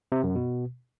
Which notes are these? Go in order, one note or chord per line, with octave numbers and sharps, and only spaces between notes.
C3
F#2
B2